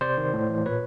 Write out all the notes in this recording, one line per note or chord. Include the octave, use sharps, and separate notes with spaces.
C3 C5 D5
D#3
A2
E3
A#2 B4 C#5